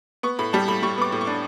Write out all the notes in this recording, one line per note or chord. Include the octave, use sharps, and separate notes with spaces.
B3 C#6
A2 B5
G3 A5
A2 B5
G3 C#6
B3 D6
A2
C#6
D4